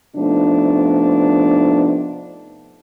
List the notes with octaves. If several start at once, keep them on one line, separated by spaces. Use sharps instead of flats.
C3 F3 A3 B3 D4 D#4